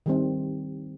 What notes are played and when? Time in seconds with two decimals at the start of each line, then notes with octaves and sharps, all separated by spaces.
0.06 D#3 G3 C4